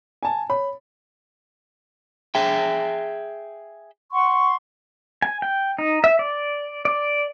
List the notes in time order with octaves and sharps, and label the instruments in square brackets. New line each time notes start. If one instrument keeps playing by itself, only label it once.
[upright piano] G#5 A5
[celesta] C#5 [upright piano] B5
[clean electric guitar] G#4 E5 G5
[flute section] F#5 C6 C#6
[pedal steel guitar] G#5
G5
D#4
E5
D5
D5